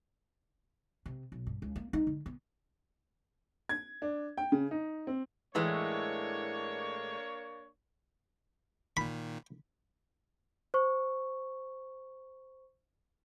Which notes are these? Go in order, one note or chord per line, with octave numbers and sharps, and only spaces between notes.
C3
B1
G2
C#2
A#3
D#4
D3
B3
G#6
D4
G5
C#3
D#4
C4
A2 E3 G#3 A#3 D4 C#5
A#2 D#3 B5
C5 C#6